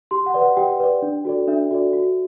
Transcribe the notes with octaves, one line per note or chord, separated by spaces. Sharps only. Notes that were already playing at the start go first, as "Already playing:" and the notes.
G4 C6
F#5
B4 D5
F#5
G4 G5
B4 D5
D4
F#4 A4 D5
D4 E5
F#4 A4 D5
F#4